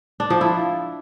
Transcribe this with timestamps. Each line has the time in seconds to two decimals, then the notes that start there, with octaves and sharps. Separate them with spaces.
0.20 D4
0.30 F3
0.41 E4